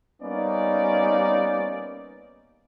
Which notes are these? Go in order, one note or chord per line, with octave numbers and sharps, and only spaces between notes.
G3 A#3 B3 C#4 D#4 D5